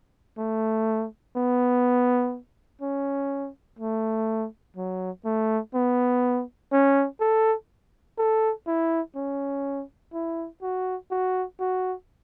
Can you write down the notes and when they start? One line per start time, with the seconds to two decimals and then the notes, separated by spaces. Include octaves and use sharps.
0.38 A3
1.36 B3
2.81 C#4
3.79 A3
4.77 F#3
5.25 A3
5.75 B3
6.72 C#4
7.21 A4
8.18 A4
8.67 E4
9.16 C#4
10.14 E4
10.62 F#4
11.11 F#4
11.60 F#4